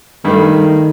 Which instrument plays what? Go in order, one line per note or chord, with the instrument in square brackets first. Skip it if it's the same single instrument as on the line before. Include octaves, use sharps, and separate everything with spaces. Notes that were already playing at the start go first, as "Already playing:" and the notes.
[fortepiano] G2 A3 [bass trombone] D#3